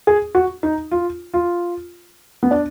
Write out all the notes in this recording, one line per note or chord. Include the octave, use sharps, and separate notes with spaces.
G#4
F#4
D#4
F4
F4
B3
D4